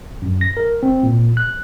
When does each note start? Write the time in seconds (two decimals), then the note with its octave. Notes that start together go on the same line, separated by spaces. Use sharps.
0.22 F#2
0.41 A#6
0.57 A#4
0.83 C4
1.03 A#2
1.37 F#6